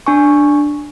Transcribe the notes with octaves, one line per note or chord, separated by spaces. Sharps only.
D4 G#5 C#6